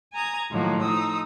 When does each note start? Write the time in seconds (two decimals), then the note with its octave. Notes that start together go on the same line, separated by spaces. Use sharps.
0.13 G#5 A#5 D#6 G#6
0.51 A2 D#3 F3 F#3 A#3
0.82 F3 D#4 D#6 E6